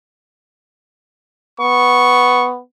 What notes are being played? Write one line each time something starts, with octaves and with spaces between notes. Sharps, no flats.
B3 C#6